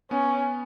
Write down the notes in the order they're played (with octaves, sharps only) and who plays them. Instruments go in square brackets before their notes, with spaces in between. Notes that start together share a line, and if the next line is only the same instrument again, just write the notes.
[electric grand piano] B3 [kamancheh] C#4